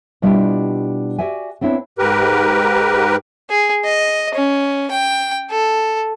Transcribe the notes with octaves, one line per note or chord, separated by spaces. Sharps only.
B2 G3 D4 E4 F4 G4
F#4 G4 D5 E5 G#5
B3 C4 D4 E4 C#5
G#2 G4 A#4 B4
G#4
D#5
C#4
G5
A4